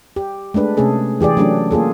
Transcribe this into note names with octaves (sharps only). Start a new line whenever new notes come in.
G4
G#3 A3 D4 B4
C3 A3 C#4 G#4 A4
E3 G4 G#4 D5
F#3 A3 C#4 D4 G4
A#3 F4 G#4 A4